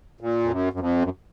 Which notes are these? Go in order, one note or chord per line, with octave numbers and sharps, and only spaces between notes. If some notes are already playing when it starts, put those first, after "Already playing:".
A#2
F2
F#2
F#2
F2
F#2